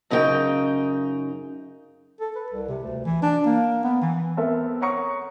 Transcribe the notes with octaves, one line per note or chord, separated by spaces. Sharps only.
F#2 C#3 D#4 A#4 G5
A4
B4
C2
C3
D2
E3
D4
A#3
B3
E3
B3 C4 A4 A#4 E5
C#5 F#5 A#5 C#6 D#6 C#7